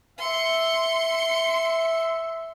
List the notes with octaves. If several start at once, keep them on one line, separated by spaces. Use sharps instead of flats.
E5 C6 C#7